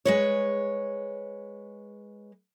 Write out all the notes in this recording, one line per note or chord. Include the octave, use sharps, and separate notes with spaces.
G#3 B4 C#5